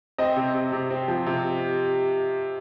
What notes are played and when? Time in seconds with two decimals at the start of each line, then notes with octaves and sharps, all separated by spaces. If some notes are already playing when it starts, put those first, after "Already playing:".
0.18 C4 D#5
0.36 C3
0.54 C3
0.72 C3
0.90 C4
1.08 F3
1.26 C3